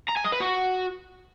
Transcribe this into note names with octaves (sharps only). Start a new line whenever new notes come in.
A#5
G#5
D#5
B4
F#4